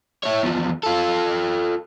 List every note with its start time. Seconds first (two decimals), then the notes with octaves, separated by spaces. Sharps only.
0.23 E4 C#5
0.43 E2 F3
0.83 F4 A4